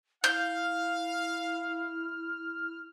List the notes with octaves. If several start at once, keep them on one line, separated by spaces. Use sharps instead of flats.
E4 F5 F6 G6